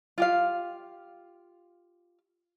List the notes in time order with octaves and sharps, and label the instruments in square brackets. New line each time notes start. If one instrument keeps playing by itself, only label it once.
[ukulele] F4 G4 F5